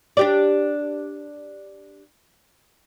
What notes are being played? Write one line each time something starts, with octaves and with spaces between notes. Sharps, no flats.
D4 G4 D5